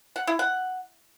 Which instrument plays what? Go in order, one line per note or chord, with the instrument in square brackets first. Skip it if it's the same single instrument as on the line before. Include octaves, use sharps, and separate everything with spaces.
[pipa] F#5
E4
F#5